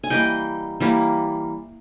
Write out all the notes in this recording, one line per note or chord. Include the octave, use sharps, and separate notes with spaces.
G#5
E3 G3 A#3 D#5 G5
E3 G3 A#3